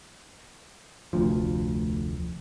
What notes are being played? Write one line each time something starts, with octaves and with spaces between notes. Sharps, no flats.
F1 D2 F3